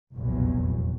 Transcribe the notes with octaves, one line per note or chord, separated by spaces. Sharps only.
F1 B1 E2 A#2 F#3